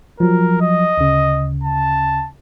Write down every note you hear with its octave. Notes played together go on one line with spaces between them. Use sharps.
F3 F#3 A#4
D#5
D2 C#3
A5